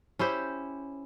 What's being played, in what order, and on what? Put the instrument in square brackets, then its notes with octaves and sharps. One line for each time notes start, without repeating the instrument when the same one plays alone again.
[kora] C#4 E4 G4 C5